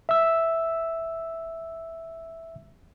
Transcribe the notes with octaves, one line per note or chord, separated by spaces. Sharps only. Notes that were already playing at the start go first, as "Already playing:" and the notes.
E5 E6